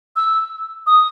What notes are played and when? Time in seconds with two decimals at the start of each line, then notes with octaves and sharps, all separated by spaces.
0.16 E6
0.87 D#6